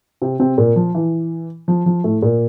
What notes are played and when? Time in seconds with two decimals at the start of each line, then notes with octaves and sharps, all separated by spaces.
0.22 C3 C4
0.39 C3 C4
0.58 A#2 A#3
0.76 F3
0.95 E3
1.68 F3
1.86 F3
2.04 A2 A3
2.22 A#2 A#3